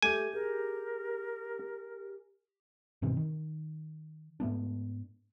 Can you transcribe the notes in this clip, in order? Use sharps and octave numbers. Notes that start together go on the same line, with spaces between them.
A3 G4 G#5 D6 G6
G#4 A#4
G2 B2 D#3 C4
D#3
G#2 A3 B3 D4